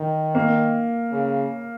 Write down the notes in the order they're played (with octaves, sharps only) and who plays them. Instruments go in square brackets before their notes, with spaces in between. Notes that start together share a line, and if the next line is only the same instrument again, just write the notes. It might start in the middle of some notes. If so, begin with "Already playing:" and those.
Already playing: [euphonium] D#3
[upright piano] A#3
[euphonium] C#3